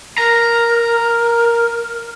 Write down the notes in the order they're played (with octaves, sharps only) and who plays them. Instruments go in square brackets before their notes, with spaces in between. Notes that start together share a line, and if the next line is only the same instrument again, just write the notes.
[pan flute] A#4 [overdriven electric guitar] A#5